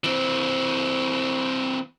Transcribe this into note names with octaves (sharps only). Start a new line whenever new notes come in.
E3 C4